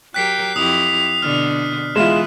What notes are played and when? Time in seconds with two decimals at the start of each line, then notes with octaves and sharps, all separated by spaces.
0.14 F#3 G4 A#4 G5 F#6 B6 C7
0.56 F2 E4 G4 D#6 F7
1.22 B2 D3 F6
1.96 E3 G#3 B3 E4 F4 B4 E7